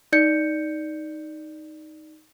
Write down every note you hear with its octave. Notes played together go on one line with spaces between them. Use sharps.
D#4 D5 G6 C#7